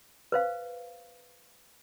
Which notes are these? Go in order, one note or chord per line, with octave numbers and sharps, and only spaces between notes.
B4 C5 F5